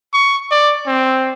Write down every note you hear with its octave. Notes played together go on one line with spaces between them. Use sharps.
C#6
D5
C4